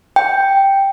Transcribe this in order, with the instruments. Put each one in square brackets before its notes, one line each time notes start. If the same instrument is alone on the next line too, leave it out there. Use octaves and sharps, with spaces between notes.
[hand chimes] G5